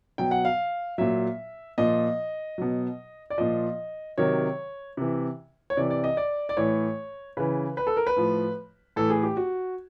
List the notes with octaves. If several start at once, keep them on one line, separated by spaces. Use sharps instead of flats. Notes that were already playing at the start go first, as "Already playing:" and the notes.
B2 F#3 G5
F#5
F5
A#2 F#3 E5
A#2 F3 D#5
B2 F#3
D5
A#2 F3 D#5
C3 D#3 F#3 C#5
C3 E3
C#5
C3 E3 D5
D5
D#5
D5
D5
A2 E3 C#5
C#3 E3 B4
B4
A4
A#4
B4
A2 F3
A2 E3 A4
G#4
G4
F#4